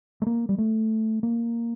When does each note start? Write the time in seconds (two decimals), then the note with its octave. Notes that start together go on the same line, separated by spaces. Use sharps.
0.22 A3
0.26 A#3
0.49 G3
0.58 A3
1.23 A#3